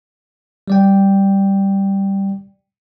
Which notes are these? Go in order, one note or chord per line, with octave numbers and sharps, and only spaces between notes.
G3 D5 G5